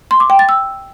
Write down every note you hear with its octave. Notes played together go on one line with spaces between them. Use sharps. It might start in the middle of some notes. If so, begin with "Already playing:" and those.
C6
D6
G5
A6
E6